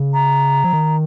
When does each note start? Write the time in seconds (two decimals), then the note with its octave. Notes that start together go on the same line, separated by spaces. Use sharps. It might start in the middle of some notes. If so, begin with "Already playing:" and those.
Already playing: C#3
0.14 A#5
0.64 F3
0.73 D#3